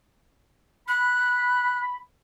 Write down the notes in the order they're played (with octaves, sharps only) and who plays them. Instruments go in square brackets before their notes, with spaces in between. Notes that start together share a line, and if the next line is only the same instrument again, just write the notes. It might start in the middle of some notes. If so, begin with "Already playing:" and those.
[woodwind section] B5 [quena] F#6